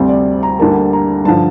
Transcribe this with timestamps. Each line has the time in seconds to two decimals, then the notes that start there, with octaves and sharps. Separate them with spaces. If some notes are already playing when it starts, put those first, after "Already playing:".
Already playing: D2 C3 G3 C4 C5
0.09 D5
0.43 A#5
0.59 D2 D3 G3 A#3 A5
0.93 A#5
1.25 G2 D3 F3 A5